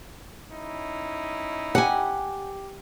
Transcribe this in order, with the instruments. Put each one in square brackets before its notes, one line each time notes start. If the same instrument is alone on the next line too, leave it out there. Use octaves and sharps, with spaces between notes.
[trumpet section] C#4 D#4 E4
[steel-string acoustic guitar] G4 [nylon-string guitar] F#5 G#5